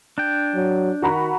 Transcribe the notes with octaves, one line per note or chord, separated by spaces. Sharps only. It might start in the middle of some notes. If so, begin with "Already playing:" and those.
D4 G5
F#3
D#3 F#4 A#5 B5